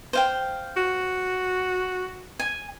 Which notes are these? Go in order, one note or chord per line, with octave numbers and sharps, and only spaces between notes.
C5 F5 G5
F#4
G#5